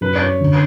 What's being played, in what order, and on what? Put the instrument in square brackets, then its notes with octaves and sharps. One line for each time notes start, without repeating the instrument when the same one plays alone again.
[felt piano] F#2 [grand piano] B4
[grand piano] D5
[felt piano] C#4 [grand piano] C#5
[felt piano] D3